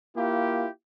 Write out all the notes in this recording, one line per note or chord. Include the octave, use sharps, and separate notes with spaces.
A#3 E4 F4 G4